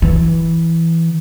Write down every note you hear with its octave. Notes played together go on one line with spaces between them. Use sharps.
E3